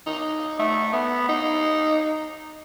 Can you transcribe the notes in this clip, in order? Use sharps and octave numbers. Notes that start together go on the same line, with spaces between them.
D#4
A3
B3
D#4